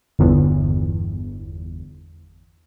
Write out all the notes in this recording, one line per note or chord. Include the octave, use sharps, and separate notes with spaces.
G1 E2